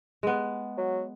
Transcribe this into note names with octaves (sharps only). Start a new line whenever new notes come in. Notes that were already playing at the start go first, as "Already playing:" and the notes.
G#3 B3
F#3